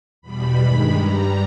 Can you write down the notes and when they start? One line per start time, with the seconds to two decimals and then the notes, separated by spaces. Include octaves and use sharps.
0.22 E2 B2 G3 B5
0.58 G2 D#3 G#3 B5
0.95 G2 G3 A#5